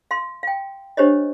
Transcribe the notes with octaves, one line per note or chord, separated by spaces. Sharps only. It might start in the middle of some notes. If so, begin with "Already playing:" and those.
F5 C6
F5 G5
D4 G4 C5 C#5 D#5